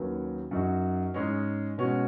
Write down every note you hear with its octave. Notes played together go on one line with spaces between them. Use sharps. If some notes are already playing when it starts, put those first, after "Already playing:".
Already playing: D#2 D#3 F#3 C#4 B4
F#2 F#3 D#4 F#4
G#2 G#3 C#4
B2 G#3 C#4 F#4